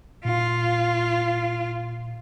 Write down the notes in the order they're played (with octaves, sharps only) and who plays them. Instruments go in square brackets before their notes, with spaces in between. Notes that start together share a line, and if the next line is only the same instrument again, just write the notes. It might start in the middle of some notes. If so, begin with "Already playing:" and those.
[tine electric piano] A#2 [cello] F4